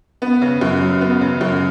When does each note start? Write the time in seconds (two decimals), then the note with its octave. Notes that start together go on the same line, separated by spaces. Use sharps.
0.22 B3
0.42 C#3
0.61 F#2
0.82 F#3
1.01 B3
1.21 C#3
1.41 F#2